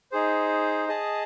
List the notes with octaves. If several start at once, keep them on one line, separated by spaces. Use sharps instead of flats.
D#4 G#4 C5
G#4 D#5 A5